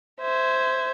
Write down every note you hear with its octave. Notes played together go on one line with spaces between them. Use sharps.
C5 E5 G#6